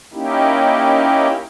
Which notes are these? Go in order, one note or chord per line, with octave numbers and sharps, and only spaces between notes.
A#3 C#4 D#4 E4 G4